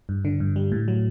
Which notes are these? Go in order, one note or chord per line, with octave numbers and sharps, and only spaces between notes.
G2
D3
G2
G3
A2
F#3